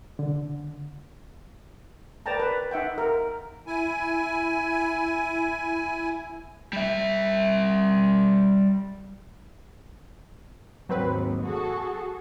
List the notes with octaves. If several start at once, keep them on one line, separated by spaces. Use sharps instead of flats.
D3
A#4 B4 D5 G5 A5 A#5
B4
D#4 E5 F#5 G5
A#4
E4 G#5
G3 E5
D#2 G#2 F#3 C4 B4
F#4 G#4 A4